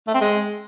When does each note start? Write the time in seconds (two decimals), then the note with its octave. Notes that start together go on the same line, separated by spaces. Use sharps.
0.08 A3
0.14 C4
0.21 G#3